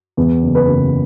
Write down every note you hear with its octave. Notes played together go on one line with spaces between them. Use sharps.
E2
F#1
B4
F#1